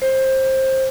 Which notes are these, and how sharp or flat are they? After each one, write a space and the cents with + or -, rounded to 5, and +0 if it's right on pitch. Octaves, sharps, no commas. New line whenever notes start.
C5 +20